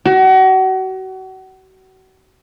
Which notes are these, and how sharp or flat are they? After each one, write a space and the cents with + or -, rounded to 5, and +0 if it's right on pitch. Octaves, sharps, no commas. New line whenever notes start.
F#4 +35